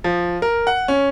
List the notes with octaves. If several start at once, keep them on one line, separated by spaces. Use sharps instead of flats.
F3
A#4
F#5
C#4